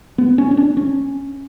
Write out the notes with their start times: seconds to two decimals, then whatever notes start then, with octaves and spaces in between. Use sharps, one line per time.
0.18 B3
0.38 C#4
0.51 C#4
0.57 D4
0.77 C#4